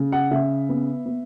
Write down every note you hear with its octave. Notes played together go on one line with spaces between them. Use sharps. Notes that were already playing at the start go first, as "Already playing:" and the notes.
Already playing: C#3
F#5
C#3 E5
B3
B3